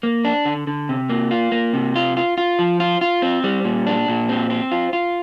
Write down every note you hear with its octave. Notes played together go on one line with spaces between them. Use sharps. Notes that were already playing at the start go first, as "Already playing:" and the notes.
A#3
D4
D3
D3
C3
A#3
F4
A#3
C3
F4
F4
F4
F3
F4
F4
C4
G3
A#2
D4
A#2
C4
C4
F4
F4